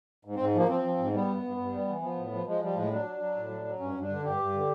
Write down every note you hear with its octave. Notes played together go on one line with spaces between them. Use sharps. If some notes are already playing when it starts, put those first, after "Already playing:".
G#2
G#2 C4
F3 A#3
F3 C4
F3
G#2
G3 B3
G2
G2
G2
G3
E3
F3 B3
A2
F3
F3 G#3
F3 G3
A2 G#3
F#3 D4
F#3
F#3
A2
F#3
F#3
G2 C#4
G2
D4
D3
G2 G4
G2
D3